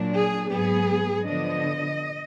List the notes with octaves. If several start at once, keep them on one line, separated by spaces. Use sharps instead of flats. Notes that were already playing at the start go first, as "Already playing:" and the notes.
Already playing: A#2 F#3 D4
G#4
G#2 F#3 B3 G#4
D3 F3 B3 D4 D#5